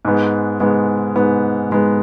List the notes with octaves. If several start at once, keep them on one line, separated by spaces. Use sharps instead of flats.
G#2 G#3 B3
G#2 G#3 B3
G#2 G#3 B3
G#2 G#3 B3